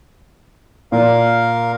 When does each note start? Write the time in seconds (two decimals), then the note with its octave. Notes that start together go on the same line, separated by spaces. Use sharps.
0.92 A#2 A#4 F5